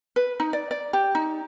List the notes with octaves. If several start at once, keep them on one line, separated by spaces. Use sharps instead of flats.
B4
D#4
D5
D5
G4
D#4